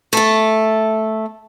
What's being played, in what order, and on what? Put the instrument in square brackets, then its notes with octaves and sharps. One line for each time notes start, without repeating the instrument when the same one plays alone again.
[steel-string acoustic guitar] A3 A4